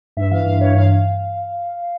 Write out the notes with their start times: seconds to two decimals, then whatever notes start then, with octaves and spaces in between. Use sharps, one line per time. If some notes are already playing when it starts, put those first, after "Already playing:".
0.17 G2 E5
0.31 E3 F5
0.46 G2 F5
0.61 E3 C#5
0.75 G2 F5